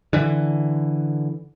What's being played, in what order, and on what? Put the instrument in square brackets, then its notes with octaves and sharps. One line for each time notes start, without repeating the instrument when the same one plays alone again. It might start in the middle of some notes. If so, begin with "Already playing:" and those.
[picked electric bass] D3 E3